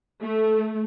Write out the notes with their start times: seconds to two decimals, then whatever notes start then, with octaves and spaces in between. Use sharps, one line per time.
0.20 A3